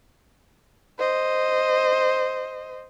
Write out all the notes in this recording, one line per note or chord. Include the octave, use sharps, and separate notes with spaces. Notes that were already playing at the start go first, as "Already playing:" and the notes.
C5 D#5